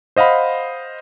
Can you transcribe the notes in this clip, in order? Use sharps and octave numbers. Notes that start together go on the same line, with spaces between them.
C5 D#5 F5 F#5 B5